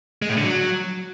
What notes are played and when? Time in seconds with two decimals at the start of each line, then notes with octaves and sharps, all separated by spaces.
0.22 G#3
0.29 A2
0.37 D3
0.44 F#3